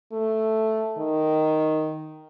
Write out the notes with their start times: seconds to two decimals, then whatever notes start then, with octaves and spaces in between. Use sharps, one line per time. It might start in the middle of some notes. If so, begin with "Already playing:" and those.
0.12 A3
0.98 D#3